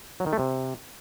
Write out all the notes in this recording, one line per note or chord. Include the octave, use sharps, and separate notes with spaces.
F#3
D#3
A3
C3